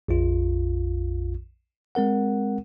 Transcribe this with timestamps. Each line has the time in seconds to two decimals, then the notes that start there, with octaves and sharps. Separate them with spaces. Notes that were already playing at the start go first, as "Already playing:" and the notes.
0.08 A#1 F2 F4
1.95 G#3 C4 A#4 F#5